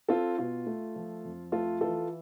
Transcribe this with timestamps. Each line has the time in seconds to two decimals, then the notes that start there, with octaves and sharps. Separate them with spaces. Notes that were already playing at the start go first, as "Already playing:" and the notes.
0.09 C4 F4 A4
0.38 B2 F4
0.67 A3
0.96 F3
1.24 F2
1.52 A3 F4 A4
1.81 E3 F4 A4